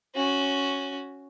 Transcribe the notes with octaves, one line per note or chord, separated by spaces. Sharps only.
C#4 F#4